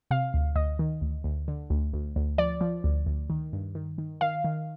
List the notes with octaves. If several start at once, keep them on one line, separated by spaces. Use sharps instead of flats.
C3 F5
D2
D2 D#5
D#3
D2
D2
D3
D2
D2
D2
F3 D5
F3
D2
D2
D#3
G2
D#3
D#3
D#3 F5
D#3